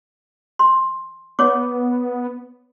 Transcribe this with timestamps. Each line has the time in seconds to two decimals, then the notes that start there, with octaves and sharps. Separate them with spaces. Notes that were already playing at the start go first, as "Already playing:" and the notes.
0.59 C6
1.39 B3 C#5 D6